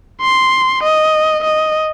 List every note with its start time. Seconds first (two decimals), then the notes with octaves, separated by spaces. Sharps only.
0.21 C6
0.83 D#5
1.44 D#5